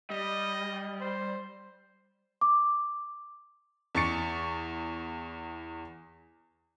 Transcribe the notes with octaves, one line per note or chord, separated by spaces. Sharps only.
G3 D#5
C5
D6
E2 C#6 A6 C#7